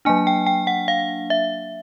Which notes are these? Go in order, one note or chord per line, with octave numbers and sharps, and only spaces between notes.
F#3 A#3 D4 G#5
G5
G5
F#5
F5
E5